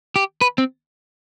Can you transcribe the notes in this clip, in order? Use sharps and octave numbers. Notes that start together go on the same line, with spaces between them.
G4
B4
C4